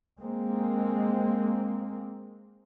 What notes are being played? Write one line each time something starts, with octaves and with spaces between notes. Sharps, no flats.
G#3 A#3 C4